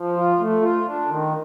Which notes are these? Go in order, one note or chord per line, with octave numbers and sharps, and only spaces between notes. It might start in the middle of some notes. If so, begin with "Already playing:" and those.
Already playing: F3
F4
A3
F4
D4
D#3